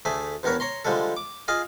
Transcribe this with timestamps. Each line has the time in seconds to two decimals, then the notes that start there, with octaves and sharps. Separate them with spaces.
0.05 D2 A3 G#4 E5
0.43 E2 G2 B3 A#4 C#5
0.60 C#5 A#5 C6
0.85 D3 F3 G3 G#3 A4
1.17 D6
1.48 F4 G#4 D#5 F5